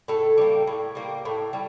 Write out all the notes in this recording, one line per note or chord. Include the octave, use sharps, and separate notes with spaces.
A2 A4
G3 A#3
A2
G3 A#3
A2
G3